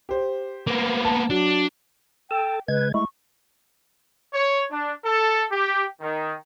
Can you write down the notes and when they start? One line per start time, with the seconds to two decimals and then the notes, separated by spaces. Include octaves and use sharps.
0.09 G4 C5
0.67 A#3 B3
1.05 A5
1.30 F#3 D4
2.31 A4 G5 A5
2.68 C#3 G#3 B4 G#6
2.94 G#3 A3 E4 C#6
4.33 C#5
4.71 D4
5.04 A4
5.51 G4
6.01 D#3